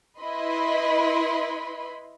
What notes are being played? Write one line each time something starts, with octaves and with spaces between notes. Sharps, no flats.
E4 B4 D#5 B5 C6